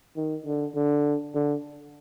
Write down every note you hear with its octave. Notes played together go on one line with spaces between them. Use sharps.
D#3
D3
D3
D3